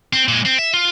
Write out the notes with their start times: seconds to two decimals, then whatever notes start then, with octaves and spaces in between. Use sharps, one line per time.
0.13 C4
0.28 A#2 G#3
0.45 C4
0.59 E5
0.73 F4